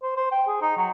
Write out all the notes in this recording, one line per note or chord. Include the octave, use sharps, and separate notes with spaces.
C5
C5
G5
G#4
D#4
F#3